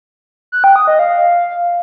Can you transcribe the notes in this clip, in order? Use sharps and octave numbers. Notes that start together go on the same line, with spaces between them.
F#6
G5
D#6
D#5
F5